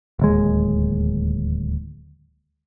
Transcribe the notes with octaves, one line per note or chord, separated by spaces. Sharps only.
D1 D#2 G#3